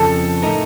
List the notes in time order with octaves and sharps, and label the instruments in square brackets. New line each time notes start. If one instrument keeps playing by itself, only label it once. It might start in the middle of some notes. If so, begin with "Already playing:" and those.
Already playing: [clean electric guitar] F2 C#3 F3 [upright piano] A4
[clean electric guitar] A2 A3 D#4 A#4